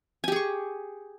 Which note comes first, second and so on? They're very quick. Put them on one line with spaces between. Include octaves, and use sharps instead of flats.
G#5 G4 G#4 C#6